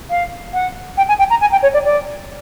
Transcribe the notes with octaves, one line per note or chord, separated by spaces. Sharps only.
F5
F#5
G5
G#5
G5
A#5
G#5
G5
C#5
D5
D5